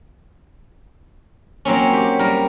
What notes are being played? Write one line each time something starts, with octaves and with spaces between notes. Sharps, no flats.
F#3 A#3 C4 C#4
G4
G3 A#4